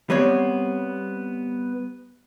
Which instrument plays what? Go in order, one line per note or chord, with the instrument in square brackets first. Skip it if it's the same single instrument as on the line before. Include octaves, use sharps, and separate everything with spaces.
[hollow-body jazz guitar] G3 B3 C4 C#5